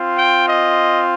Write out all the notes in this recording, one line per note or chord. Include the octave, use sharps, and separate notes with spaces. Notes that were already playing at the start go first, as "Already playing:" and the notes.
Already playing: C4 F4
G5
D#5